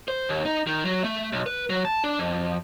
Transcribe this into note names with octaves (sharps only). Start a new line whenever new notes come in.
C5
D#2
D#4
D#3
F#3
A3
B1
B4
F#3
A5
D4
F2